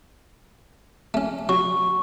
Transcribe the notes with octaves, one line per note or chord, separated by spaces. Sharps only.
A3 C#4
F#3 C#6